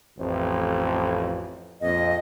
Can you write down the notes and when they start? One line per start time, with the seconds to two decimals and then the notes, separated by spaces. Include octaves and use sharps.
0.19 A1 F2
1.81 A#1 F2 D#5